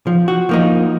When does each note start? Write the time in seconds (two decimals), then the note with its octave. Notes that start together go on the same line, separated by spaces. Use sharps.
0.07 F3
0.28 F#4
0.49 F3 A#3 D#4